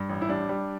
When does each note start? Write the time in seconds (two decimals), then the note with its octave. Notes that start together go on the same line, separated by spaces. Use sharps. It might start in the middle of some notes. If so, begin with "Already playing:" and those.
Already playing: G2
0.09 A1
0.22 E4
0.29 G3 D4
0.49 G3